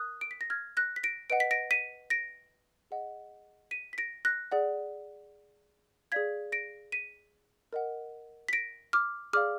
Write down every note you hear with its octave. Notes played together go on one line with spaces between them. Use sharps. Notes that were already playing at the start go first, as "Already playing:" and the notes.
Already playing: A#4 D#6 F#6
D7
B6
A#6
F6 G#6
F#6 A#6
B6
A#6 D7
B4 D#5 F#5 D7
B6
A#6 D7
B6 D#7
A#6 D7
G#4 D#5 F#5
B6 D#7
B6
A#6 D7
F#6 A#6
G#4 D5 F#5
G#4 D5 F5 G#6 B6
A#6 D7
B6 D#7
A#4 D#5 F#5
B6
A#6 D7
D6 F6
G#4 D5 F5 D6 F6